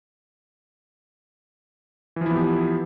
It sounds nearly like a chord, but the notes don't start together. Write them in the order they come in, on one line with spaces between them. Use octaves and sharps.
E3 F3 E4 B3 G4